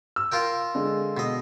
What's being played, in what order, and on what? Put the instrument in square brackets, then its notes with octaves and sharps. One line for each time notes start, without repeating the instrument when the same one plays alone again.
[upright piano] E6
[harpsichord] F4 A#4 G5
[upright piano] D3 G#3
[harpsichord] B2 D#5